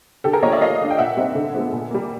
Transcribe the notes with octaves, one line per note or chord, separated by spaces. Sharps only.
D3 G4 A4
G#4 A#4
F3 A#3 C#5 D#5
D5 E5
F3 D#5 F5
A3 D4
G5
A#2 E5 F#5
G3 C4 D#4
D3
F3 G#3 B3
A#2
G3 A#3